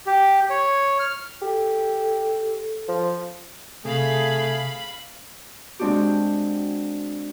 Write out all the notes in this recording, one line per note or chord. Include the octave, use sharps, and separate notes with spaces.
G4
C#5
F6
G4 A4
F3
C3 A3 G#4 F5 B5
G#3 C4 D4 F#4 G4